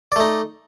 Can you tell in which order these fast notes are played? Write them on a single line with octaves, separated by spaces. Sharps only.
D5 A3 D#4